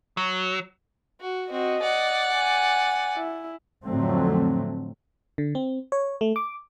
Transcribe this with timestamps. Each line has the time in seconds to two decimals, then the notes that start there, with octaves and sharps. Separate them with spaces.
0.17 F#3
1.20 F#4
1.50 C4 F#4 D#5
1.82 D5 F#5
2.33 G#5
3.16 E4
3.85 F2 A2 D3 F#3 A3 C4
5.38 D3
5.55 C4
5.92 C#5
6.21 A3
6.36 D6